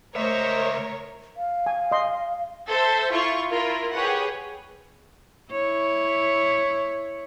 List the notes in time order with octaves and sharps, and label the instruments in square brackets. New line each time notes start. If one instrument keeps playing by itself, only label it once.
[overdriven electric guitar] C#2 E5 [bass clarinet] A3 [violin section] A#4 C#5 [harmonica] C5 D#5
[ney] F5
[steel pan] G#5
D#5 C6
[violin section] A4 C5 E5
E4 F4 C#6
E4 F4 A#4
G4 G#4 B4 C#5 F#5
[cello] E4 C#5